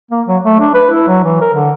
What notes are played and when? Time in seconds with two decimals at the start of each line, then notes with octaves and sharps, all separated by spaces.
0.11 A#3
0.28 F#3
0.44 A3
0.60 D4
0.74 B4
0.90 E4
1.07 F#3
1.24 E3
1.41 A#4
1.54 D3